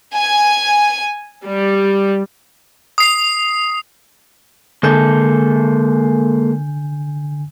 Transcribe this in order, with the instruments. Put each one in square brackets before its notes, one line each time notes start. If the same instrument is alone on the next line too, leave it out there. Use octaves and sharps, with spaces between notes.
[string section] G#5
G3
[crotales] D#6 C7
[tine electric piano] D3 G#5 G6 [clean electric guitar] G#3 A#3 A4